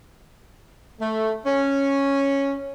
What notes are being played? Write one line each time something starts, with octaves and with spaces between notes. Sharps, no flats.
A3
C#4